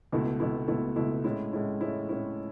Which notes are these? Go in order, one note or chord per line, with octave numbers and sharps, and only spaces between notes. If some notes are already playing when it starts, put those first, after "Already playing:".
C#2 B2 A3 E4
C#2 B2 A3 E4
C#2 B2 A3 E4
C#2 B2 A3 E4
A2 G#3 C#4 E4
A2 G#3 C#4 E4
A2 G#3 C#4 E4
A2 G#3 C#4 E4